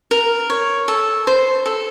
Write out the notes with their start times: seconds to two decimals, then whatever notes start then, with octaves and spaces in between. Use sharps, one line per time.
0.11 A#4
0.50 C#5
0.88 A4
1.27 C5
1.66 A4